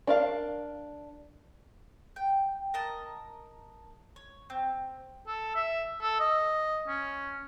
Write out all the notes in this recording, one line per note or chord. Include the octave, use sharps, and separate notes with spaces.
D4 A#4 F5
G5
A#4 D#5 A5
C#5
C4
A4
E5
A4
D#5
C#4